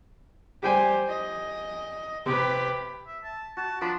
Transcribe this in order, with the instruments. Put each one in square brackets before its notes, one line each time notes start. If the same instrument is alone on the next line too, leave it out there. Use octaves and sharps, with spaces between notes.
[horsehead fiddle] G3 C5 [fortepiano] G4 G5 G#5
[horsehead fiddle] D#5
[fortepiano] C3 [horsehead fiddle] G4 B4
[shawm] E5
A5
[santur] F#4 [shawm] A5
[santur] F3 B5 C6 [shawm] D4